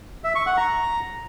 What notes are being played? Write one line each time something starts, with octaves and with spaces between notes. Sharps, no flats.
E5
C#6
F#5
A#5